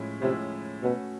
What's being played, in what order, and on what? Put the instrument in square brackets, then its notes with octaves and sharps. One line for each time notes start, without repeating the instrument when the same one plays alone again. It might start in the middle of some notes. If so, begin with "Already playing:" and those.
Already playing: [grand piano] A2 F3 G#3 C#4 E4
[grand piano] A2 F3 G#3 C#4 E4 [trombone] C3
[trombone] B2 [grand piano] A3 C#4 F#4 B4